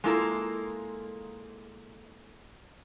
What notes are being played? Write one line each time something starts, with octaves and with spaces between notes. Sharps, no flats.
G#3 A#3 E4 F4 A4 A#4